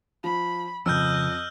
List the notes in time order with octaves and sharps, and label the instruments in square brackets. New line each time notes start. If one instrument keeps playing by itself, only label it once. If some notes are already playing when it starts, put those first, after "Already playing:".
[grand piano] F3 [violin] B5
[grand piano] F2 [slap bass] C#3 F3 [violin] D#5 [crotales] E6 F6 G6